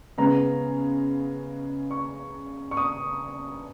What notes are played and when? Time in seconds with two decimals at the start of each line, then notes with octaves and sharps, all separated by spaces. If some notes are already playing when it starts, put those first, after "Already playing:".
0.18 C#3 G#3 B3 A#5
1.91 C#6
2.71 C#6
2.77 D#6